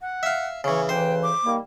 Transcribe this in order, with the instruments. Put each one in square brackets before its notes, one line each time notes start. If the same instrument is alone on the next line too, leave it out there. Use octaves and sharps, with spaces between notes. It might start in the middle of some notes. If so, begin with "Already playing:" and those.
[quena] F#5
[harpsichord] E5 F5
[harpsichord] C#3 E3 [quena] C#5
[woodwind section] D2 C#3 E3 [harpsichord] C5 [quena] G5
[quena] D6
[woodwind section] D#3 G3 A#3